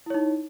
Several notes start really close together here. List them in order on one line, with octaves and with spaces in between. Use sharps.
E4 C#5 D#4